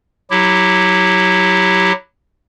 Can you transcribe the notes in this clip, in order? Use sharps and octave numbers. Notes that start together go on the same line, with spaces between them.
F#3 E4 G4